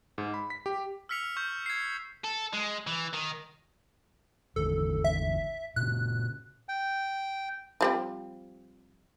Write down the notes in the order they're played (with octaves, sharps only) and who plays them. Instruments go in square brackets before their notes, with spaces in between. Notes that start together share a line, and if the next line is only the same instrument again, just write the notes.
[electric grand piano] G#2
B5
B6
G4
[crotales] E6 F6 B6 C#7 F7
C#6 G6
G#6 C7
[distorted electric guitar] A4
G#3
E3
D#3
[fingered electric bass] G#1 E2 D3 [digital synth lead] A4
[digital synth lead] E5
[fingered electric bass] A#2 C#3 [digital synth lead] F#6
[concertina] G5
[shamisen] F3 G3 C4